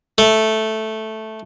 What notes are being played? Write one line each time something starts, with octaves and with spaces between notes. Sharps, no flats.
A3